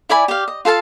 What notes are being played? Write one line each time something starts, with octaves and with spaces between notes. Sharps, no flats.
E4 D5 G#5 B5
G4 F5
D#5
F4 A4 F5 A5